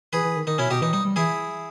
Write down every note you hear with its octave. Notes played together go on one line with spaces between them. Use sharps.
E3 G#4 B4
E3
D#3
D#3 D#4
B2 C#4 E4
B2 D#4 G4
E3 D#4
G3 D#4
G3
E3 E4 G#4